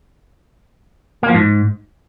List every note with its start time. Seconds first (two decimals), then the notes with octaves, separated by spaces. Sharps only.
1.23 A#3
1.29 F3
1.35 G#2